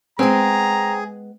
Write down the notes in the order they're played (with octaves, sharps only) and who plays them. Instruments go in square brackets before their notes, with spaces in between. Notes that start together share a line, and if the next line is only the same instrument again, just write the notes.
[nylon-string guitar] G#3 B3 [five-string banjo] C4 [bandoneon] G#4 [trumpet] A#5